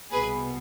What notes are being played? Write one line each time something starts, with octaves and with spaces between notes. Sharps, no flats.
C2 B2 G#4 B4